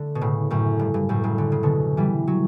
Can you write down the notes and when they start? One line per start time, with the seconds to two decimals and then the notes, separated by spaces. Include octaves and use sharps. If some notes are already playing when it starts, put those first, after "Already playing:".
Already playing: D3 A3
0.15 B2
0.21 A2 C#3
0.51 F#2 A2
0.79 G2
0.94 G2
1.09 F#2 A2
1.24 A2 C#3
1.38 D3
1.52 C#3
1.63 B2 D3
1.97 E3 G3
2.27 F#3